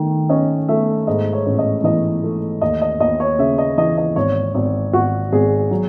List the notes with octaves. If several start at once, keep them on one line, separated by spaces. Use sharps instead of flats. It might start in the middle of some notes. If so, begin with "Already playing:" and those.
Already playing: D#3 A3
C#4 D#5
A3 E5
G#2 D#5
C#5
A1
D#5
E3 D#5
A3
D#2 D#5
D#5
D#2 D#5
C#5
C#3 E5
D#5
E3 D#5
D#5
G#1 C#5
G#1
G#1 F#4
G#1 G#4
F#3